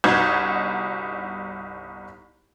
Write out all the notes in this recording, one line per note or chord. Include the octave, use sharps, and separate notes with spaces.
G1 C2 D#4 F#4 G6 G#6